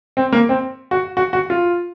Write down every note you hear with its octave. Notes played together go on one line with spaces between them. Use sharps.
C4
A#3
C4
F#4
F#4
F#4
F4